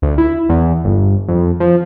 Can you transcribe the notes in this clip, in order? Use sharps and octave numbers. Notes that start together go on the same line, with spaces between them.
D2
E4
E2
G1
F2
F3